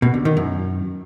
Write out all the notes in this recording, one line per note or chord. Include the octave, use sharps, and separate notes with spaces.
B2
D3
D#3
F#2